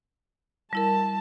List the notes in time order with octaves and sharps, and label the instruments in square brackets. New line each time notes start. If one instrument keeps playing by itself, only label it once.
[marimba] G3 E4 A#4 [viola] A5